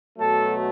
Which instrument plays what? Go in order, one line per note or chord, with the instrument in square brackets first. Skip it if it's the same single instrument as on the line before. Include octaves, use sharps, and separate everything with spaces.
[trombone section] B2 F#3 A3 A4